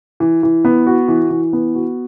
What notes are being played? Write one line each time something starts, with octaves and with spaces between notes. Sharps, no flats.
E3
E3
B3
F#4
E3
E3
B3
F#4